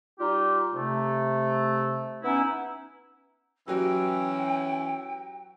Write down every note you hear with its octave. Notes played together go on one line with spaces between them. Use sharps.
G3 D#4 F4 G4
C3 A3
B3 C#4 D#4 E4
E3 F#3 C#4 F#4 G4 G5 E6